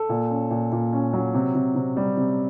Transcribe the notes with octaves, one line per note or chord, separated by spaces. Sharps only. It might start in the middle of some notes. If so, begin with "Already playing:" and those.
Already playing: A4
A#2
C#4
A#2
A#2
C#4
F#3
C3
C3
C3
G3
C3